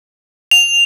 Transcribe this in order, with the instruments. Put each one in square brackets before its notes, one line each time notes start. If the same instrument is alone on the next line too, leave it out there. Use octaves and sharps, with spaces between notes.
[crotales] F7